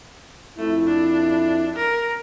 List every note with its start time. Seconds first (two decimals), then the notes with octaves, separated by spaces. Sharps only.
0.58 F2 A3 E4
0.87 D4
1.76 A#4